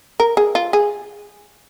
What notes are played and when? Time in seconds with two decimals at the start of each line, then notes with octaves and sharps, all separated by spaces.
0.20 A#4
0.37 G#4
0.55 F4
0.73 G#4